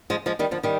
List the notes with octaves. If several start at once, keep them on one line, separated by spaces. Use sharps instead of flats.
F3 G#3
F3 G#3
D#3 G3
D3 F3
D#3 G3